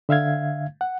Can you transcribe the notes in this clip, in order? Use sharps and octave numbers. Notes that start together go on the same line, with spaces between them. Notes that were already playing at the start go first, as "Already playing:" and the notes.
D3 E5 F5 G#6
F#5